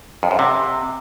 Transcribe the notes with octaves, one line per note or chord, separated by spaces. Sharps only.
F2
F#2
C3